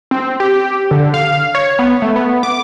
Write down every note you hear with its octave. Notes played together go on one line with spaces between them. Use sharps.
C4
G4
D3
F5
C#5
B3
A3
B3
D6